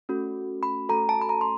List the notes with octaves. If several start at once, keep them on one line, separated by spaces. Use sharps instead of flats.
A3 C#4 F#4 A4
B5
A3 C#4 F#4 A4 A#5
A5
B5
A#5
C6